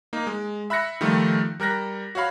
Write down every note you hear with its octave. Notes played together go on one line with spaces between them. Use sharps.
A#3 D#4
G#3
E5 B5 F#6 A#6 C#7
D#3 F3 G3 A3
G3 A#4 F#6 A#6 B6
F#4 C#5 F5 B5